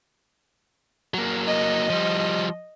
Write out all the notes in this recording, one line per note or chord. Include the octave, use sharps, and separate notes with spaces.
F#3 A#3
D#5
F3 G3